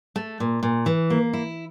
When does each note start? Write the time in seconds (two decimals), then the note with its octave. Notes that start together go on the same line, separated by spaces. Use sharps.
0.16 A3
0.40 A#2
0.63 A#2
0.86 E3
1.10 A#3
1.33 E4